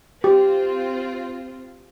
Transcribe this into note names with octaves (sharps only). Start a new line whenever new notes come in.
C4 F4 G4